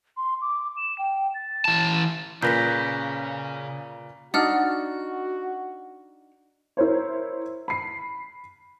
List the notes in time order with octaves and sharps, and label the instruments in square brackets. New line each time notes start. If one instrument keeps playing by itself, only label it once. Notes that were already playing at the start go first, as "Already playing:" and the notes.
[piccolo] C6
D6
E7
G5
A6
[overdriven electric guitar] E3 A5
[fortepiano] A#2 B4 [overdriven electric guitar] C#3 [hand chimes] G6 A#6 B6
[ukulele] D4 D#4 [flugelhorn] F#4 [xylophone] D5 F#5 F6
[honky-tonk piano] E4 A#4 C5 C#5
B5 C7